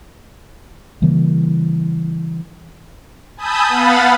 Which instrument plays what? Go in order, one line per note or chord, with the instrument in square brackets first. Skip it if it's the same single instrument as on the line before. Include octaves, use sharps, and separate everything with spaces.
[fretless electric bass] C#3 E3 G3 A#3
[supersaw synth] G#5 A5 B5 D#6 E6 G6
B3 F5 F#5 B5 A6